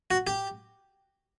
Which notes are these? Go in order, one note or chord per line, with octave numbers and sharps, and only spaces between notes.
F#4
G4